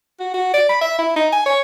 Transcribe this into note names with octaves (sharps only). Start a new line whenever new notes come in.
F#4
F#4
D5
B5
E5
E4
D#4
G#5
C#5